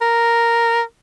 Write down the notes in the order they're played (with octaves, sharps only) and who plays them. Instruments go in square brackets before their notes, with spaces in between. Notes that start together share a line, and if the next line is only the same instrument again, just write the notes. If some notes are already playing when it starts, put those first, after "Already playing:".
[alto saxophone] A#4